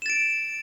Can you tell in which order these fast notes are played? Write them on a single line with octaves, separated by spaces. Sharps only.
E7 A6 D7